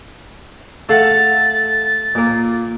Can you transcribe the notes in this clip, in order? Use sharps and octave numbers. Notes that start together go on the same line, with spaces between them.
A3 A4 F5 F#5 A6
A#2 A#3